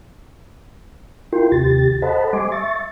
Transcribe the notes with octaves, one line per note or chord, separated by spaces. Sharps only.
E4 F4 A#4 G5 C6
D#2 C3 G4 A6
A4 C5 D#5 F#5 A5 B5
G3 D#5 G#5 C6 D6
E5 C#6 A6